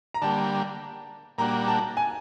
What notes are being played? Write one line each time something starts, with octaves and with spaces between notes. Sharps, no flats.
A#5
D3 G3 A#3 A5
A#2 G3 A#3 D4 F#4 A#5
A5
G#5